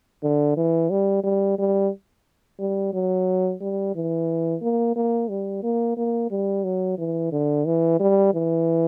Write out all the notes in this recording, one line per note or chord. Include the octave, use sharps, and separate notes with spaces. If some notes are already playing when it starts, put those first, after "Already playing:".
D3
E3
G3
G3
G3
G3
F#3
G3
E3
A#3
A#3
G3
A#3
A#3
G3
F#3
E3
D3
E3
G3
E3